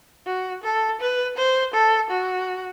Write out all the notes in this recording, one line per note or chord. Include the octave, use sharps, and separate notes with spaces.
F#4
A4
B4
C5
A4
F#4